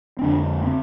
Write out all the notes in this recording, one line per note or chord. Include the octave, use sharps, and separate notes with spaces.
C4
F2 D3 D4
A#3
D3 C4